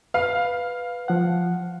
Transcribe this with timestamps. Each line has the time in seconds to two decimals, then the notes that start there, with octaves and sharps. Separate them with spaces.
0.14 B4 F5
1.08 F3 F#5